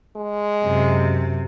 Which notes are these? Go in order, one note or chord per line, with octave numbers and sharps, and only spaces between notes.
G#3
F#2 C3